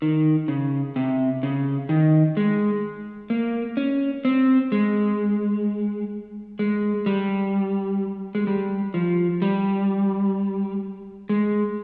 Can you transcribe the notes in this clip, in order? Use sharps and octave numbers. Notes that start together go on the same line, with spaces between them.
D#3
C#3
C3
C#3
D#3
G#3
A#3
C#4
C4
G#3
G#3
G3
G#3
G3
F3
G3
G#3